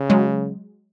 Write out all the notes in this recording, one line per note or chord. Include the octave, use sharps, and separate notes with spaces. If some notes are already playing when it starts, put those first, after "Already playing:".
Already playing: C#3
F#3 G#3